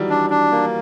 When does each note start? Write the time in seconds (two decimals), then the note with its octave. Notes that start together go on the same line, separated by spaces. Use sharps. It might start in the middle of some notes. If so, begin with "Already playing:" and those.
Already playing: D#3 E3 F#3 G3
0.10 D4
0.30 D4
0.52 A#3